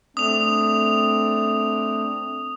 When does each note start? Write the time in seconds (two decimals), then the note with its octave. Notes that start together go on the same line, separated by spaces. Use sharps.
0.17 A3 C4 D4 D#6 F7